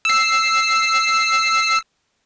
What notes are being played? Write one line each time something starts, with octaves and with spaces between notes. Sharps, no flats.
E6 C7